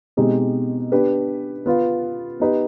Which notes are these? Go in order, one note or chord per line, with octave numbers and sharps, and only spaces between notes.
B2 G#3 C4 D#4 G4
B3 D4 G4 B4
B3 F4 B4
B3 D#4 G4 B4